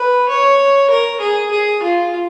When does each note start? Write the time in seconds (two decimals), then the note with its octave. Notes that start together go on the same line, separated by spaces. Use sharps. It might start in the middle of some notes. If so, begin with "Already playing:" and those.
Already playing: B4
0.29 C#5
0.90 A#4
1.20 G#4
1.51 G#4
1.83 F4